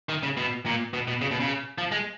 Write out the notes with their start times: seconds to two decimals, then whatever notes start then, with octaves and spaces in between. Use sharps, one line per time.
0.09 D#3
0.23 C#3
0.37 B2
0.66 A#2
0.93 B2
1.08 B2
1.21 C#3
1.31 B2
1.40 C#3
1.78 F3
1.92 G#3